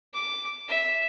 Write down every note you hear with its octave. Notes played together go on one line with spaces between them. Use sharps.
D6
E5